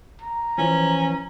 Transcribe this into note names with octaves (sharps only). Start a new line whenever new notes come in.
A#5
E3 F3 C#4